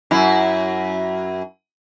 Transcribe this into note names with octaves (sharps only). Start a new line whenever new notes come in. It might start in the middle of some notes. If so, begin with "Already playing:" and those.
F#2 E4